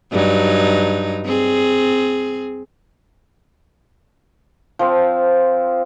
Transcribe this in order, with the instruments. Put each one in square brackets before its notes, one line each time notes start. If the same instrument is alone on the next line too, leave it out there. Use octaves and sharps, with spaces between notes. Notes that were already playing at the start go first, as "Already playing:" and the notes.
[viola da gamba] G2 F#3 D#4
C4 G#4
[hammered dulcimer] F3 C4